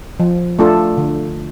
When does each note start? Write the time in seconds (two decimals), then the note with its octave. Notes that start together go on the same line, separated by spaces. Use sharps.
0.20 F3
0.59 A3 D4 F4 A4
0.97 D3